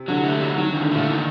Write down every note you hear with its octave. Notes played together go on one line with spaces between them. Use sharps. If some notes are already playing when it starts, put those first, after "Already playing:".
Already playing: C3
D3 F#3
A3
F#3
D#3 F#3
D3
D#3
D3
A#2 A3
D#3